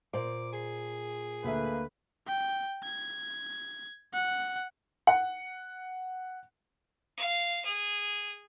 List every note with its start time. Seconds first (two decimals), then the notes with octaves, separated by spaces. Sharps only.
0.13 A#2 C5 D6
0.53 G#4
1.44 D2 A#3 A4 B4 E5
2.27 G5
2.84 G#6
4.14 F#5
5.07 F#5
7.18 F5
7.65 G#4